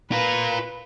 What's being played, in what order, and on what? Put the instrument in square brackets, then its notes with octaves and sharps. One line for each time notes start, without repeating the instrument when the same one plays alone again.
[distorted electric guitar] F4 A#4 [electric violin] B4